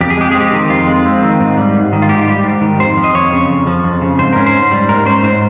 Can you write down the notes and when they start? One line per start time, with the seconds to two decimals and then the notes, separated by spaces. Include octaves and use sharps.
0.01 F2 G4
0.10 G#4
0.18 G#3 G4
0.31 G#4
0.35 C4
0.40 G4
0.53 D#3
0.70 F2 F4
0.87 G#3
1.06 C4
1.22 D#3
1.40 G#2
1.58 G3
1.74 G#2
1.93 D#3
2.02 F4
2.09 G#2 G4
2.28 G3
2.44 G#2
2.61 D#3
2.80 F2 C5
2.97 F3
3.04 D#5
3.14 F2 C#5
3.32 C#3
3.49 F2
3.67 F3
3.84 F2
4.02 C#3
4.19 G#2 C5
4.33 C#4 A#4
4.46 C5
4.54 G#2
4.71 G3
4.89 G#2 A#4
5.06 C#4 C5
5.23 G#2 C5